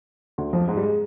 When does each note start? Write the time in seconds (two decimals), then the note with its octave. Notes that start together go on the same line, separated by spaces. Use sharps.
0.38 D2 D3
0.53 F2 F3
0.68 G#2 G#3
0.77 G3
0.83 G#3